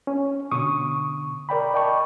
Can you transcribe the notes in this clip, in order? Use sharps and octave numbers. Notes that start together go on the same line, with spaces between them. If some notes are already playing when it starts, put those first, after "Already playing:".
C#4
B2 D3 C#6 D#6
A#4 D5 G5 B5
D5 D#5 G5 A5 C#6